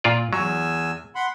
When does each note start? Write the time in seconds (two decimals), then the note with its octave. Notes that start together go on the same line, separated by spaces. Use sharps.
0.04 A#2 F4 D5
0.33 E2 F#3 G#5 E6
1.15 F#5 B5 C6